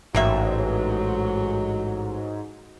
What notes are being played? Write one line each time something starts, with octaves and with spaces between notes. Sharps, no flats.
A1 G#2 D#3 F#3 A#3 E5